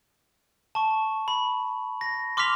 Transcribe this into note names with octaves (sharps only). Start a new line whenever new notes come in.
A5 C#6
B5
A#6
C6 D6 F6 A#6 B6 F7